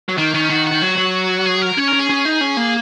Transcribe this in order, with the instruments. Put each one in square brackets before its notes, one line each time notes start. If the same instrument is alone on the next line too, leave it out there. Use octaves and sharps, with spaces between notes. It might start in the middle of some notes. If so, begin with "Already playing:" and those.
[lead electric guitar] F#3
[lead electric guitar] D#3 [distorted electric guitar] A#3
[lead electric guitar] D#3 [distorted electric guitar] C#4
[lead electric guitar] D#3 [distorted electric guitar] F#4
[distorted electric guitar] F#4
[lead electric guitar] D#3
F#3
F#3
[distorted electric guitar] G#4
A#4
[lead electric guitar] C#4 [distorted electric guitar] C#5
[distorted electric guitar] A#4
[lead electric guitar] C#4
[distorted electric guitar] G#4
[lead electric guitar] C#4
D#4
C#4
A#3